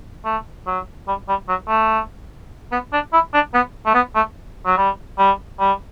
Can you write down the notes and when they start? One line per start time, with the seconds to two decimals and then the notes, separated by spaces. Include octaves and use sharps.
0.25 A3
0.67 F#3
1.08 G3
1.28 G3
1.49 F#3
1.68 A3
2.72 B3
2.93 D4
3.13 E4
3.34 D4
3.54 B3
3.86 A3
3.94 B3
4.15 A3
4.66 F#3
4.77 G3
5.19 G3
5.60 G3